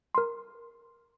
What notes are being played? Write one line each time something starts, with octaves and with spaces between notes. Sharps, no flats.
A#4 C6